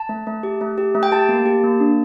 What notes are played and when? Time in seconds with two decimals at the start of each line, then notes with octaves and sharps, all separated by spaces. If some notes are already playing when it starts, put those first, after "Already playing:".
Already playing: A5
0.09 A3
0.27 A3
0.43 G4
0.61 A3
0.78 G4
0.95 A3
1.03 G5
1.12 G4 A5
1.29 A#3
1.46 G4
1.64 A#3
1.80 D4